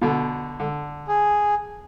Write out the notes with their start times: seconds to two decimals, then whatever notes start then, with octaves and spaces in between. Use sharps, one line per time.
0.02 B2 D3
0.60 D3
1.08 G#4